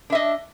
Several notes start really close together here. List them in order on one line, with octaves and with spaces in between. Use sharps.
D4 E5 D#5